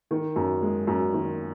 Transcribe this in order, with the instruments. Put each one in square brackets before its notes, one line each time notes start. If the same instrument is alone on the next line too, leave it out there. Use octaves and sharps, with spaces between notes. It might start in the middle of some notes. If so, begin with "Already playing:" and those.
[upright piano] D#3
F#2
G#3
F#2
D#3